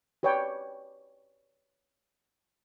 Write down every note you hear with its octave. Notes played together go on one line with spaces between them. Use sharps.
G4 B4 C#5 D5 G5